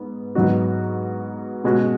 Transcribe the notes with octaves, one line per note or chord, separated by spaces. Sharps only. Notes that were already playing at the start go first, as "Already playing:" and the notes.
Already playing: G#2 B3
G#2 F#3 B3 D#4 F#4
B2 G#3 C#4 F#4